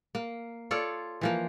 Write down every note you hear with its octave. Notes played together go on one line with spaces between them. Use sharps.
A#3
F4 A4 C#5 D5
E3 F3 A#3